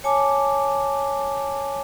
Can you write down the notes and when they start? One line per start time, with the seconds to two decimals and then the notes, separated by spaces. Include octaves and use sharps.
0.04 C#5 G#5 A5 D6